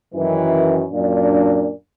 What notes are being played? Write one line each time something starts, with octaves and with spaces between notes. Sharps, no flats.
F#2 D#3 E3
F#2 A#2 A#3 D4